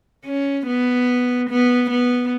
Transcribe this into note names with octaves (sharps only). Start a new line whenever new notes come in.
C#4
B3
B3
B3